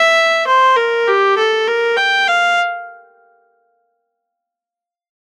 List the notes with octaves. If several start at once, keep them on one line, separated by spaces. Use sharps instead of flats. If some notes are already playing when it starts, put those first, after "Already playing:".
Already playing: E5
C5
A#4
G4
A4
A#4
G5
F5